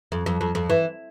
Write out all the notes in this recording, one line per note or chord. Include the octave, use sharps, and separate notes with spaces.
F2
F2
F2
F2
E3